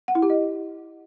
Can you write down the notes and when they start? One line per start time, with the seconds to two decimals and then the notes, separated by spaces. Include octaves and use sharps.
0.08 F#5
0.15 E4
0.22 G4
0.30 D#5